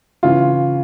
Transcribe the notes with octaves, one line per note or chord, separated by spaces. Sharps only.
C#3 E3 F4